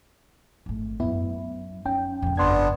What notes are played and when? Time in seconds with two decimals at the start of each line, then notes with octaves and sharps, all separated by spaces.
0.66 G#1 A3
1.00 F#2 F#3 B3 E4
1.85 C#4 D#4 G5
2.22 F2 C#3
2.37 G1 B3 D4 C6 G#6